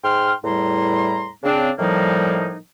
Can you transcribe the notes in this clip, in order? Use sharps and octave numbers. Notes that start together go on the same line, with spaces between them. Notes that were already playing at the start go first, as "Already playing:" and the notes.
G#2 G5 C6 F6
E2 A2 G3 E4 A#5 C6
C#3 C4 D4
A2 D#3 F3 G3 A#3 D#4